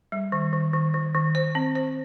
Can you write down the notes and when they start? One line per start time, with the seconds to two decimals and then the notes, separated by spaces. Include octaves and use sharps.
0.12 G3
0.32 D#3
0.53 D#3
0.73 D#3
0.94 D#3
1.15 D#3
1.35 C5
1.55 C4
1.76 C5